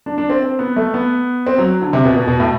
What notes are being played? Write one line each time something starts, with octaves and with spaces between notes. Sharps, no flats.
D4
D4
C4
C4
B3
A3
B3
C4
F#3
D3
C3
B2
B2
B2
A2